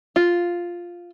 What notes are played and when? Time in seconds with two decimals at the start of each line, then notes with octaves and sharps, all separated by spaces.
0.16 F4